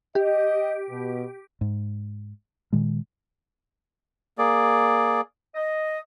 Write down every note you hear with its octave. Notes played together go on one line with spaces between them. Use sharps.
G4 D#5
B2
G#2
A#2 D#3 G#3
A#3 G#4 D5
D#5